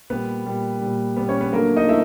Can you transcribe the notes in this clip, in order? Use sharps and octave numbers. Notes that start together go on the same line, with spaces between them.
A#2 G3 B3 B4
A#2 G3
A#2 G3
A#2 G3 B3 B4
C#4 C#5
B3 B4
D3 F#3 A3 A#3 A#4
D#4 D#5
A3 E4 E5